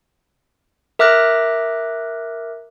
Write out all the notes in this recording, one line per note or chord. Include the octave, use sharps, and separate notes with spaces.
A#4 E5 D6 F6 F#6 A#6